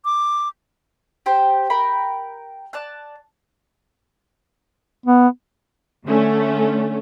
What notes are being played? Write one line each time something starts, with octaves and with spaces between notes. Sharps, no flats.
D6
G4 C5 G5
A#4 G5 B5
D5 A5 F#6
B3
D3 A3 C#4